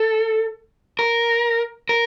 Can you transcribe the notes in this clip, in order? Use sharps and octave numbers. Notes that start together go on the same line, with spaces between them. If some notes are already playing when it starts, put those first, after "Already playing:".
Already playing: A4
A#4
A#4